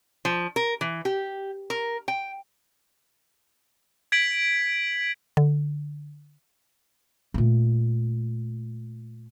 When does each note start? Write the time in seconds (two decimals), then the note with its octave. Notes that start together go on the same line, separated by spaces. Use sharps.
0.25 F3
0.56 A#4
0.81 E3
1.05 G4
1.70 A#4
2.08 G5
4.12 G#6 B6 D7 F#7
5.37 D3
7.34 A#2 A3